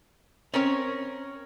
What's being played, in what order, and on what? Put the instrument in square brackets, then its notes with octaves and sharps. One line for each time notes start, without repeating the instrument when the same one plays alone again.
[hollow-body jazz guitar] C4 [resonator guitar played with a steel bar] C#4 A#4 C#5